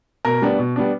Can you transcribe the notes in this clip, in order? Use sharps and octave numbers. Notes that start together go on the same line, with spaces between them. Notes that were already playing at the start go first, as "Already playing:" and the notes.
B2 A#4
G3 B3 D4
B2
G3 B3 D4